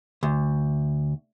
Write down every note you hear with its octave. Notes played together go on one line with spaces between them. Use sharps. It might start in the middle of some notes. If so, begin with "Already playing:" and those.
D2